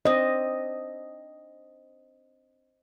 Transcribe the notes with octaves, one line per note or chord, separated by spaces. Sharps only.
C4 D4 D#5